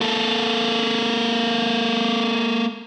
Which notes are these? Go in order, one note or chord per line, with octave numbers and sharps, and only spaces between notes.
A#3 A4